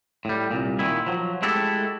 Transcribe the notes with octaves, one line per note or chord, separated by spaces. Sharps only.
A2 G3
C2 A#2
A#2 D#3 E4
F3 F#3
G#3 A3 E4 F#4 G4 A4